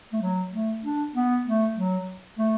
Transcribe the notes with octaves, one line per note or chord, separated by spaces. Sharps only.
A3
F#3
A3
D4
B3
A3
F#3
A3